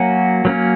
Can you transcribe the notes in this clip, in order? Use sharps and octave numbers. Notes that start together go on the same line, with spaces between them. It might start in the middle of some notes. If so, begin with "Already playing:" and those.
Already playing: F#3 A#3 C#4 F#4
F#3 A#3 C#4